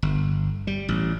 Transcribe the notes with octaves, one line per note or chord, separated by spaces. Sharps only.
G1
G3
A1